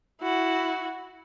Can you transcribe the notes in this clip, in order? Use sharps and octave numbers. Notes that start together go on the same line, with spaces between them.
E4 F#4